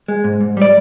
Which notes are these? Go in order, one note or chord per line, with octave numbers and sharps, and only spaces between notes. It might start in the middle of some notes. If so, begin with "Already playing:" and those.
G#3
G#2
G#2
G3 D5